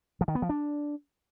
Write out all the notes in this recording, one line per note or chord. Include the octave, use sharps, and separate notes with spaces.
F3
D#3
B3
F3
D4